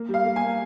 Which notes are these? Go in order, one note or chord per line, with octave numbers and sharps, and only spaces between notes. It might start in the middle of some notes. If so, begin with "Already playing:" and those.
Already playing: A#3
G3
F5
A#3
G#5